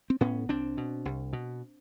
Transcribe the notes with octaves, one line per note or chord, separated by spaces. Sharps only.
C4
A2 B3 C#4
C2 C4 D4
B2
C2
B2